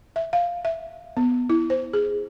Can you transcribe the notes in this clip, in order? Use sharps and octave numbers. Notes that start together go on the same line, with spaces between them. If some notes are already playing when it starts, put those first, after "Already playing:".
E5
F5
E5
B3
E4
C5
G#4